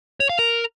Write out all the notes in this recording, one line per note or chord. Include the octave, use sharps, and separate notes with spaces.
C#5
F5
A#4